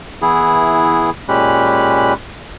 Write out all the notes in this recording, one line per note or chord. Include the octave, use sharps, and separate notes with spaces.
E3 B3 E4 G#4
A#2 G#3 C#4 G4 B5 F#6